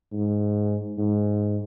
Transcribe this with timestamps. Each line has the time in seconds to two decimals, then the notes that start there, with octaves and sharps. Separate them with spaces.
0.13 G#2
0.98 G#2